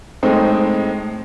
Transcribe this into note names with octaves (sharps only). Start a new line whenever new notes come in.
A2 G#3 C4 D#4